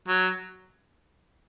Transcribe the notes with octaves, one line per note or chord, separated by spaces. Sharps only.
F#3